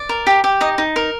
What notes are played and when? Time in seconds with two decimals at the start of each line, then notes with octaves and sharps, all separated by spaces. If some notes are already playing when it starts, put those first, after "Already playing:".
Already playing: D5
0.09 A#4
0.27 G4
0.44 G4
0.61 D#4 D#5
0.78 D#4
0.96 A#4